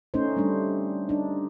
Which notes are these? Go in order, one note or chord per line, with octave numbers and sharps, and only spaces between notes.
A3 C#4 D#4 C5
G3 A3 D4
D4 D#4